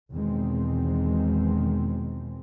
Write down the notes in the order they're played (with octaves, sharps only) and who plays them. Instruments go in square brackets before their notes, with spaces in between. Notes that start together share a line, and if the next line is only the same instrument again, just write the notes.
[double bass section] E2 B2 D#3 G#3 C4